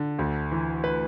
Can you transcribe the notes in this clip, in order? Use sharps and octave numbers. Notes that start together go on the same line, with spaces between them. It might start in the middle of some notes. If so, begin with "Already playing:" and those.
Already playing: D3
D2
E3
B4